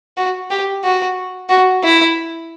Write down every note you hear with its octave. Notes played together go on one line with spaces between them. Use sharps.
F#4
G4
F#4
F#4
E4